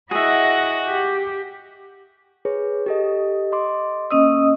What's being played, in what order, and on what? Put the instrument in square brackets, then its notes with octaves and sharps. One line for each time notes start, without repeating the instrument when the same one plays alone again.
[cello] E4 D#5 [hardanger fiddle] F#4 F#5 [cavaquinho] G#4 E5
[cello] G4
[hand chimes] G#4 B4 C#5
G4 A4 D#5
D#5 C6 D6
[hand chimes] A#3 E6 [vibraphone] C#4 D#5 D#6